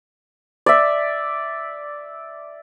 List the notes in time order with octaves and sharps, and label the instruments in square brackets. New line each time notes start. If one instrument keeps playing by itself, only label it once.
[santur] D5 E5